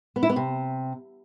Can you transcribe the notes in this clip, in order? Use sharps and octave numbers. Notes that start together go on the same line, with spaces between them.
B3
E4
B3
C3